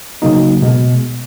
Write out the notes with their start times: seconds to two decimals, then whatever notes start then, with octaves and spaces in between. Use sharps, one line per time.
0.22 C#3 F#3 A#3 D#4 F#4
0.62 B2 G#3 B3